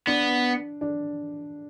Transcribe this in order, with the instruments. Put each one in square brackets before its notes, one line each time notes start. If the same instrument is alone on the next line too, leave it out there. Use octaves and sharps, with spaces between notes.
[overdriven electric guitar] B3 [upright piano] D4
[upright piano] D4